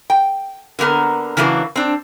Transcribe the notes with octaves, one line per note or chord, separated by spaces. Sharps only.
G5
D3 A#3 B3 A#4
C#3 E3 F#3 A#3 D4
C4 D4